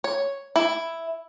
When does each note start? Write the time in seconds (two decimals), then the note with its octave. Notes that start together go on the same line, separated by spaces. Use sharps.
0.04 C#5
0.56 E4